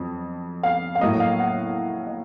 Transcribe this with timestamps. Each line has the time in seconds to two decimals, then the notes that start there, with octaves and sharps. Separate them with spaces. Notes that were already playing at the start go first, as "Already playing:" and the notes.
Already playing: F2 F#3
0.63 F5
0.95 F5
1.01 A2 F#3 A#3 D#5
1.20 F5
1.39 F#5
2.06 D#5